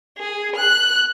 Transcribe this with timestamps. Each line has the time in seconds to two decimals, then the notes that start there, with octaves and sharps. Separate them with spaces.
0.17 G#4
0.56 F#6